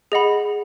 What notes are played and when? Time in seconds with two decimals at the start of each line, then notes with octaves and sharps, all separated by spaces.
0.12 G#4 D#5 F#5 B5